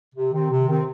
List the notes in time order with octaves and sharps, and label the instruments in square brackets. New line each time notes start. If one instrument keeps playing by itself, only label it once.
[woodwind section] C3
D#3 C4
C3
D#3 C4